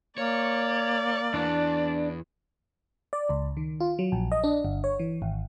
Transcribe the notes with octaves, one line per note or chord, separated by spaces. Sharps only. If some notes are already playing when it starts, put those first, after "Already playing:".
A#3 C#5 D5
E2 D4
D5
C#2
D#3
F4
F#3
A#1
D#5
D4
G1
C#5
E3
G#1